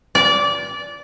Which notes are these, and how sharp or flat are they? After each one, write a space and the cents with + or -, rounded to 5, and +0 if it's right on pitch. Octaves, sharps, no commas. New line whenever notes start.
D5 -20